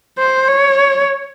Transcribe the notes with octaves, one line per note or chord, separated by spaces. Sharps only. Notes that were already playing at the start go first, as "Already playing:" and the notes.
C5
C#5